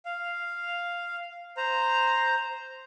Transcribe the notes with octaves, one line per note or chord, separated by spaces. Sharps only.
F5
C5 A#5